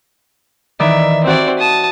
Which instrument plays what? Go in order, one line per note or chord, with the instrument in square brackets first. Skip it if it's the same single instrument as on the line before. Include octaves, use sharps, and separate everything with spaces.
[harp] D#3 E3 D5 [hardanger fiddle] E5
[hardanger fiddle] C4 D5 [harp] F#4 E5
[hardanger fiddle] A5 D#6